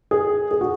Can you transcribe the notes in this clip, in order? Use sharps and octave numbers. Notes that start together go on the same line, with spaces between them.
G#4
G#4
F#4